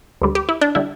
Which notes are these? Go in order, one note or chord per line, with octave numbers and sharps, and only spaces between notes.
D2 D3 G3
G4
E4
D4
D3 G3 E4